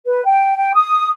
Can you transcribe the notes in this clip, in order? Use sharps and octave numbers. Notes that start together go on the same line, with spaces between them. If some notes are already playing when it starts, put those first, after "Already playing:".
B4
G5
G5
D#6